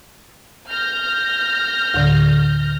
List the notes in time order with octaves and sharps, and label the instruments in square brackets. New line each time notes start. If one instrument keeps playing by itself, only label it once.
[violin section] F6 G6 A#6
[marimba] D2 A2 D3